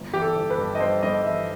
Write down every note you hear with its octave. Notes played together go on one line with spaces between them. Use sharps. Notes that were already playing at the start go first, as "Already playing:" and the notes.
Already playing: G1
E3 G4
A4
G1
B4
G2
D#5
G2 C5
G2 D#5
E3 E5